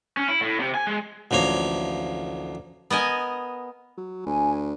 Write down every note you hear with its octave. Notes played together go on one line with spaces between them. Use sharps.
C#4
E4
A2
C3
G#5
G#3
A1 D2 F3 A#3 C#5
B3 A#4 D#5 G#5
F#3
D2 G#5